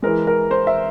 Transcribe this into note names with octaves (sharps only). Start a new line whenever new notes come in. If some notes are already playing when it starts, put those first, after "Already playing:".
E3 G#3 A#4
A#4
C5
E5